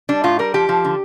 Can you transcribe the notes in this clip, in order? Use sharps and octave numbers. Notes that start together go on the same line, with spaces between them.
G3 D4
A2 F4
G3 A#4
F3 G4
F3
D3